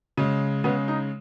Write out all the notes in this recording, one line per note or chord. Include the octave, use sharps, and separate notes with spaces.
C#3 G#3
C#3 G#3 B3
D#4